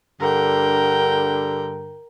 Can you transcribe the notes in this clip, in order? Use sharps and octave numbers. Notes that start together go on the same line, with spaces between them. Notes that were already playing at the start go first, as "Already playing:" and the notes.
G2 D3 A#4 G5